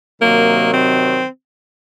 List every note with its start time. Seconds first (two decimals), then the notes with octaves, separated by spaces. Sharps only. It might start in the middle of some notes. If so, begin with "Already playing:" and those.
0.22 C3 D#3 F#3 A#3
0.73 C4